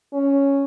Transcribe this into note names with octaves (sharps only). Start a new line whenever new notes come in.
C#4